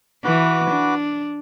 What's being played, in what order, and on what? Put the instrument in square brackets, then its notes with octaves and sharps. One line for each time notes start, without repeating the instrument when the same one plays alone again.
[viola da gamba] E3 [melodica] F#4 B4 D6
[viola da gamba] D4